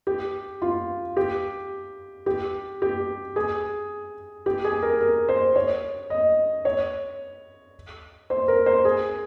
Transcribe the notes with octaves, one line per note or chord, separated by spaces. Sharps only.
G4
F4
G4
G4
G4
G#4
G4
G#4
A#4
A#4
C5
C#5
D#5
C#5
C5
A#4
C5
G#4